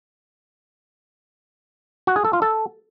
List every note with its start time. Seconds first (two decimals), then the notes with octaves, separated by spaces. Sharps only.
2.07 F#4
2.16 G#4
2.25 A4
2.33 F4
2.42 A4